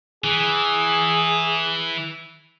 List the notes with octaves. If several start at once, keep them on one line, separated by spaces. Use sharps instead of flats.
E3 G#4